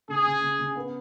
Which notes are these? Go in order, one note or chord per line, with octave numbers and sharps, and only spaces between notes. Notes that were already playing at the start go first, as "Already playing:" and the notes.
C#3 G#4
C#3
C#3
C#3
B3